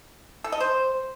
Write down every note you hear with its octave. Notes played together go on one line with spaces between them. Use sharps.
A4
D#5
C5